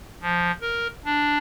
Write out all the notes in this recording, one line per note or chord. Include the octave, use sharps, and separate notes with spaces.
F3
A#4
D4